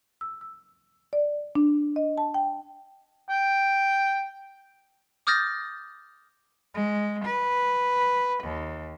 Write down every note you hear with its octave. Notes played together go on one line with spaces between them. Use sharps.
E6
E6
D5
D4
D#5
A5
G5
G5
D6 D#6 F6 G6 A6 A#6
G#3
B4
D#2